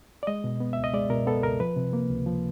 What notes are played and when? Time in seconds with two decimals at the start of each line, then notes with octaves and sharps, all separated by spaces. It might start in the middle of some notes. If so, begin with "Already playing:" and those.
0.23 D5
0.27 G#3 D#5
0.44 B2
0.60 B3
0.73 C#2 E5
0.84 D#5
0.93 G#3 D5
1.10 B2 A#4
1.27 B3 A4
1.43 C#2 A#4
1.60 F3 B4
1.76 C3
1.93 A#3
2.10 C#2
2.26 F3